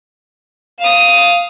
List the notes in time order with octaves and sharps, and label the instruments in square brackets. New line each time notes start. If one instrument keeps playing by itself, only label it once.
[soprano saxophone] F5 [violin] D#6 E7